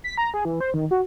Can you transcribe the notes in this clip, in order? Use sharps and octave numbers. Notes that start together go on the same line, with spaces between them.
B6
A#5
G#4
E3
C5
D#3
F#4